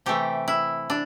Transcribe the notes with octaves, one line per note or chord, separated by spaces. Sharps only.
C3 E3 A3 G4
E4
D4